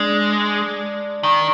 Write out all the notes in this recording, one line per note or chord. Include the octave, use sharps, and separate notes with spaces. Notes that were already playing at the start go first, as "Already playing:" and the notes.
Already playing: G#3 D4
D#3